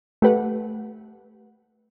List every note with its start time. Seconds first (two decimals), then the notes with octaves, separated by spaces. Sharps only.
0.22 A3 G4 B4 F#5